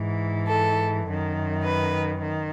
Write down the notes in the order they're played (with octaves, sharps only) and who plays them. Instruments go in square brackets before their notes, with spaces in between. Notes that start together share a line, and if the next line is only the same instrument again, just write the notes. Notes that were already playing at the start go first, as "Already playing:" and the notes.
Already playing: [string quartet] G#2 E3
A4
F#2 D#3
B4
D#3